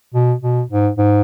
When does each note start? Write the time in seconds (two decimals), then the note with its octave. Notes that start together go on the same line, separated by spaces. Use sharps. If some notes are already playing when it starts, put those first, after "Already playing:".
0.14 B2
0.43 B2
0.70 G#2
0.98 G#2